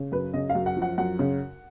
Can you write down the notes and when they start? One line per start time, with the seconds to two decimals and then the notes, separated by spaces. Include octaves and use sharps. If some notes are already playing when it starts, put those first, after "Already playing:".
Already playing: C#3
0.12 F#2 B4
0.33 C#3 D#5
0.50 F5
0.55 F#2
0.66 F#5
0.77 F3
0.82 F#5
0.98 F#2 F#5
1.19 C#3